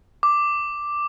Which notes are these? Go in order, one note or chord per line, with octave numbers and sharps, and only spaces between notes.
D6